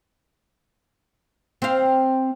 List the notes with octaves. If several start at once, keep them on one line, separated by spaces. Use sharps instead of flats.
C4 F5